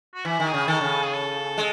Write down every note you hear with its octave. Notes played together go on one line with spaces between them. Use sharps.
F#4
E3 E4
D#3
G#4
C#3
D#3 A4
C#3
G#4
A4
G#3